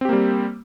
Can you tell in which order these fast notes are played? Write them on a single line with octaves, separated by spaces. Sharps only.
C4 G4 A#3 G3